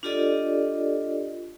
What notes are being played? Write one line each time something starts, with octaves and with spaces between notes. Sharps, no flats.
D4 F4 G4 A4 D5 D#5